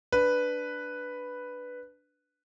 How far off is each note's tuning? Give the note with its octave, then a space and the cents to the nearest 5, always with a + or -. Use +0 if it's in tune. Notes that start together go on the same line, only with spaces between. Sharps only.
D4 +0 B4 +0